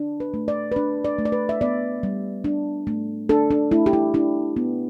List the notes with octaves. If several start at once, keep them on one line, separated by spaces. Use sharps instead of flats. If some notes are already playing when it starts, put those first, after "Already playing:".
Already playing: D4
B4
A3
D5
B4
D4 D5
D5
A3
D5
B4
E5
B3 D5
G3
D4
A3
D4 A4
D4
A3 E4
G4
E4
D4 E4
B3